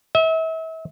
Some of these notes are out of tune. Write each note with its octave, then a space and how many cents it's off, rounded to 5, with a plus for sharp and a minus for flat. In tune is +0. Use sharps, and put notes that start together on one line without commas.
E5 -35